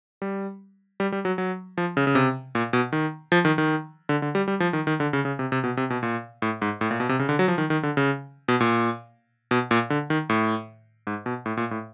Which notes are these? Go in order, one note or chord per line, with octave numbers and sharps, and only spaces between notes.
G3
G3
G3
F#3
F#3
F3
C#3
C#3
C3
A#2
B2
D#3
F3
D#3
D#3
D3
D3
G3
G3
F3
D#3
D#3
D3
C#3
C#3
C3
C3
B2
C3
B2
A#2
A2
G#2
A2
A#2
B2
C3
C#3
D3
F#3
F3
D#3
D#3
D3
C#3
B2
A#2
B2
A#2
D3
D#3
A2
G#2
B2
A2
A#2
A2